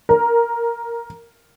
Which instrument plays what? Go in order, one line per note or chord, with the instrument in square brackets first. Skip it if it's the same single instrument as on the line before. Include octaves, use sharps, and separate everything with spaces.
[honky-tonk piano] A#4